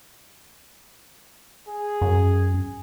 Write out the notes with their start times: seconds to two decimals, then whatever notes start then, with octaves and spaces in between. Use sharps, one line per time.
1.69 G#4
2.02 F#2